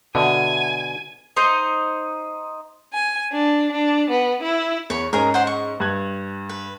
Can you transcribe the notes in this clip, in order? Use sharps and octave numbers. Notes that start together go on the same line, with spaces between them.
B2 D3 E5 F#5 G#5 A5
D#4 C5
G#5
D4
D4
B3
E4
E2 C#5 B5
G#2 C#4 G#4 A#4
C5 F#5 C6
C#6
G2 F#6 G#6
B4